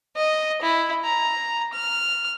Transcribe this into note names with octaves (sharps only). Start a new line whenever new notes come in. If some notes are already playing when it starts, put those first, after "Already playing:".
D#5
E4
A#5
F6